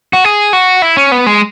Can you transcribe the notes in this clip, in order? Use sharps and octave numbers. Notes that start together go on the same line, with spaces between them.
F#4
G#4
F#4
E4
C#4
B3
G#3